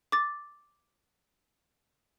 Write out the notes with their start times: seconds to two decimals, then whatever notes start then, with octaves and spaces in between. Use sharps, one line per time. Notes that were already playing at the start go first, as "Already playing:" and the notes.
0.12 D6 A6